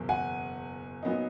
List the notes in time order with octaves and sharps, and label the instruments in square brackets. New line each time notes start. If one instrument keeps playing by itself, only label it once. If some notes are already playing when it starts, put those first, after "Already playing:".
Already playing: [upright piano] F#1 E2 B2
[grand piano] F#5 G#5
[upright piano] A#2 F#3 B3 D#4